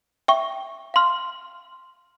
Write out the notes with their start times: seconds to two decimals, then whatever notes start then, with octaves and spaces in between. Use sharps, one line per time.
0.28 E5 G5 C#6
0.94 F5 C6 F6